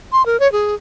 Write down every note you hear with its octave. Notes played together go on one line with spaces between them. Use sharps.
C6
A#4
C#5
G#4